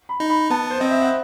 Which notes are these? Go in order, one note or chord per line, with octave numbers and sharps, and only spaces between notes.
B5
D#4
B5
B3 A5
C5
C4 D#5
E5
F#5